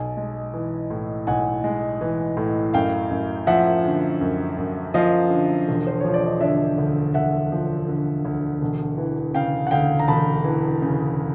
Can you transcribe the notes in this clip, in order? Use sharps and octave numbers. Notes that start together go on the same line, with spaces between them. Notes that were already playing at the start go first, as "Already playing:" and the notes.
Already playing: B1 G#5
G#3
E3
A2
B1 F#5 G#5
G#3
E3
A2
F#2 F5 G5
F#2
F3 E5 F#5
D3
F#2
F#2
F3 D#5 F5
D3
E1
C5
F3 C#5
D5
D#5
D3 D5 E5
D2
E1 E5 F#5
F3
D3
D2
E1
E3
C#3 F5 G5
F#5
D2 F5 G5
A#5
E1 A5 B5
E3
C#3